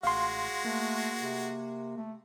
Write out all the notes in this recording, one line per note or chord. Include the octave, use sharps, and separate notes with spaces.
A1 G#3 F#4 F5 C6
A3 A#3
C3
A3